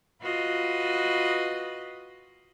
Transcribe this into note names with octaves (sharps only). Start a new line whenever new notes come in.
F4 F#4 B4 D#5